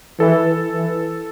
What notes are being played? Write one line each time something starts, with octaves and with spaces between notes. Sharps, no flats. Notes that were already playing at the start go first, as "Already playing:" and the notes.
E3 A4
E3